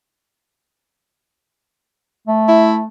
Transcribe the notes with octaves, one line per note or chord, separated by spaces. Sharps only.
A3
E4